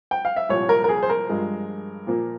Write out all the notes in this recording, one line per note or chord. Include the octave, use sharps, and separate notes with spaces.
G5
F5
E5
C2 A#2 F3 C#5
A#4
A#4
G#4
C5
A#4
G2 F3 G#3
A#2 F3 A#3